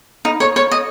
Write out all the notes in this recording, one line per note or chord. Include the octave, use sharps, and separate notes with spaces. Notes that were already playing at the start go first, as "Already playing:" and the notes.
D#4
C#5
C#5
D#5